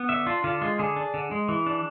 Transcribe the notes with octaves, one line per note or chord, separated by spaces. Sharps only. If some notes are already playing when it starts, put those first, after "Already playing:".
Already playing: B3
D3 E5
D4 F4
D3 F4
G#3 F4
D3 G#4
D4
D3
G#3
E3
D4